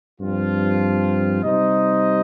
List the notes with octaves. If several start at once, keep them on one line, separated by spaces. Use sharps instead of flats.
G2 F3 C4 F4
C3 G3 D#4 C5 D#5